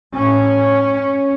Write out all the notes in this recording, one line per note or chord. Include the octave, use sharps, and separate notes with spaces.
A2 C#4